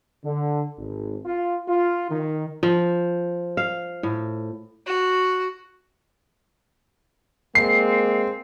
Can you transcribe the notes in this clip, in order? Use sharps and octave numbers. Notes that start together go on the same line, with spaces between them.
D3
G#1
F4
F4
D#3
F3
F5
A2
F#4
G#3 A#3 C4 C7